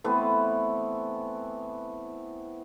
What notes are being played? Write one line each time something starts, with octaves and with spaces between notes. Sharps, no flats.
E3 A3 B3 C4